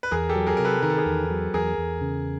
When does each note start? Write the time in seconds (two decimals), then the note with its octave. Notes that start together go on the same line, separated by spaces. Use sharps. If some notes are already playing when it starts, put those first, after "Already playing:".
0.03 B4
0.11 E2 G#4 A#4
0.29 G4 A4
0.35 F#3
0.47 G#4 A#4
0.57 C3 A#4
0.65 A4 B4
0.83 D#3 A#4
0.90 A4
0.98 G#4 A#4
1.06 E2
1.30 F#3
1.54 E2 G#4 A#4
1.78 E2
2.01 C#3